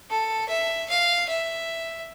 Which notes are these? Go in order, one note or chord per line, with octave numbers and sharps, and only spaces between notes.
A4
E5
F5
E5